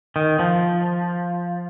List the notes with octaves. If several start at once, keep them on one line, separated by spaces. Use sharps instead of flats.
D#3
F3